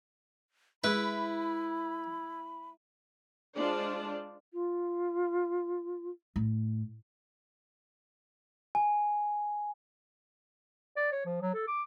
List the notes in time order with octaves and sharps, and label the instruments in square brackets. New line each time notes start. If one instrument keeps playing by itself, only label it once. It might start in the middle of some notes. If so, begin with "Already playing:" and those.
[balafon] G#3 G#4 [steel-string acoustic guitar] E4 [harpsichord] B4 [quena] B5
[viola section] G#3 D4 F4 C5 D5 A5
[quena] F4
[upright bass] A2
[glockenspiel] G#5
[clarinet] D5
C#5
F3
F#3
A4
D6